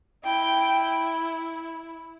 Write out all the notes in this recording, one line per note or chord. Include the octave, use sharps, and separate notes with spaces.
E4 G5